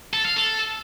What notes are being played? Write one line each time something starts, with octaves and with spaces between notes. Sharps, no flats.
A4
F5
A4